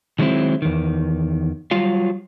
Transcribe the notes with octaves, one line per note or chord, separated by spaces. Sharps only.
D#3 F#3 G#3 A3 C4 E4
E2 D#3
F#3 G3 F4 F5